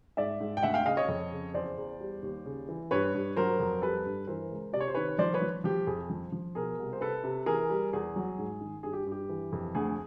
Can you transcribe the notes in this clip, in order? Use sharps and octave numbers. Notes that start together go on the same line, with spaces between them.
G#2 D5 E5
G#2
G5
D2 E5 F#5
F5 G5
C#3 D#5 F5
C#5 D#5
F2
C#3
E2 C5 D5
E2
G3
D#2
C#3
E3
G2 B4 C#5
G2
F#3 A#4 C5
F2
G3 A4 B4
G2
E3 A#4 C5
C#2
C3 D5
C#5
C5
D#3 B4 C#5
F3 C5 D5
B4 C#5
F3
F3 G4
F2 G#4
F3
F3
B2 G#4 A#4
C2
C5
C3 A4 B4
C3
E3 G#4 A#4
G3
E2 G#4
F#3
G#2
D#3
G2 G#4
G4
G2
G4
E3
F2
D2 G#4